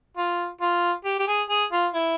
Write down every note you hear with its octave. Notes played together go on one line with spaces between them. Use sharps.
F4
F4
G4
G4
G#4
G#4
F4
E4